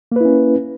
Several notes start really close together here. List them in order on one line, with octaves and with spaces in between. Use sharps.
A#3 B4 E4 C#4